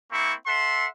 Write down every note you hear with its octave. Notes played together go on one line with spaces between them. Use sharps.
A#3 C4 E4 C#6
A4 E5 F#5 C6